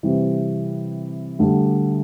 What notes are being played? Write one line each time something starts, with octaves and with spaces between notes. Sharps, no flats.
C3 E3 G3 C4 G4
D2 D3 G3